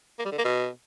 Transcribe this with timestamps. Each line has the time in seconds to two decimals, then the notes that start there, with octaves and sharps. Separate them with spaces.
0.19 A#3
0.25 G3
0.32 D3
0.38 A#3
0.45 B2